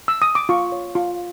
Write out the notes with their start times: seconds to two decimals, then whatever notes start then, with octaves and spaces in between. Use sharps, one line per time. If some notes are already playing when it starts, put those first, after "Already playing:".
0.08 E6
0.22 D#6
0.35 D6
0.49 F4 C#6
0.72 C#5
0.95 F4